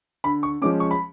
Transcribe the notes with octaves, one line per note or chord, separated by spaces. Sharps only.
D3 B5
C#6
F3 G#3 C#4 D6
C#6
B5